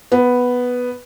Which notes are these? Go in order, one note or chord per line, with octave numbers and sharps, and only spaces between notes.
B3